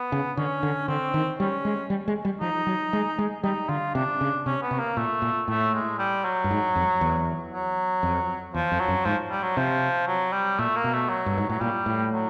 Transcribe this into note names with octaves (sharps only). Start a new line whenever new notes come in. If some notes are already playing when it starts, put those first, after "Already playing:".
Already playing: B3
C#3
D3 C#4
D3
D3 C4
D#3
G3 C#4
G#3
G3
G#3
G3
F3 D#4
F#3
G#3
G#3
G3 D#4
D3 F4
C3 D4
C#3
C3 C#4
B3
C3
A#3
A#2 A3
A#2
A2 A3
G#3
G3
F#3
G2
G#2
F2
E2
F#3
F2
E2 F3
F2
F#3
F#2
G#2 F3
G3
F#3
C3 F3
F#3
G3
A#2 A3
A#3
B2
A3
F#3
G2
G#2
A2 F#3
A#2 G3
A2
F#3